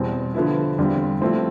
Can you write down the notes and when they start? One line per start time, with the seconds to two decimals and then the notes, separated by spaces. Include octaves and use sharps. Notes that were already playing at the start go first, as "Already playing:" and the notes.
Already playing: E2 B2 G3 C4
0.34 D3 F3 B3 E4
0.78 E2 D3 G3 C4 F4
1.21 A2 F3 A3 C4 E4